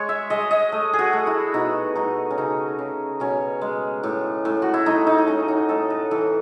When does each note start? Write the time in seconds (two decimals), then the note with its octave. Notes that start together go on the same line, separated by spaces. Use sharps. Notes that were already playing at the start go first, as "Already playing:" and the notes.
Already playing: G#3 C#5
0.09 E5
0.30 G#3 D#5
0.51 D#5
0.72 A3
0.93 G#4
0.99 F#4
1.13 A3
1.27 E4
1.54 B2 D#4
1.96 A3 D#4
2.31 C#4
2.38 C#3 D#4
2.79 C#3
3.20 B2 C#4
3.61 G#3
4.03 A2
4.45 A2
4.62 F#4
4.74 E4
4.86 A3 D#4
5.07 D#4
5.18 D#4
5.27 A3 C#4
5.48 D#4
5.69 A2 A4
5.90 B4
6.11 E3 A4